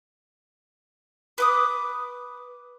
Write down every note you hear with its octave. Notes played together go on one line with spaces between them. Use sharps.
B4 D6 D#6